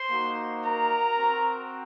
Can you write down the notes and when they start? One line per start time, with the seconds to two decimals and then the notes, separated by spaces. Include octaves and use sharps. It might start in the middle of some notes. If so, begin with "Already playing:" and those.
Already playing: C5 C6
0.10 A#3 D#4 F#4
0.64 A#4 A#5
1.18 C4 F#4